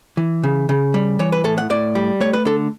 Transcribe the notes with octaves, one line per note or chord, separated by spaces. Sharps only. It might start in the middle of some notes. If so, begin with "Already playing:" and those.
E3
C#3
C#3
G3
E3 C#5
B4
A2 A4
F#5
A2 D5
G3
A3 C#5
B4
D3 A4